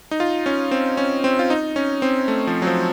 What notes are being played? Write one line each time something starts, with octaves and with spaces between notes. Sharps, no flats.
D#4
F4
C#4
C4
C#4
C4
F4
D#4
C#4
C4
A3
F3
F#3
F3